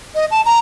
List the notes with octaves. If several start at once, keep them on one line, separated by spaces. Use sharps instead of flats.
D#5
A5
A#5